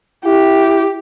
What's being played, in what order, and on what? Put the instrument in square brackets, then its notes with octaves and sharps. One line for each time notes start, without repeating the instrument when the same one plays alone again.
[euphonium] E4 [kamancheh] G4